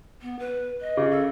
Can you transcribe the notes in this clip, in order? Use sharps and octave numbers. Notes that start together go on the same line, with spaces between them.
B3
B4
D#5
C#3
A4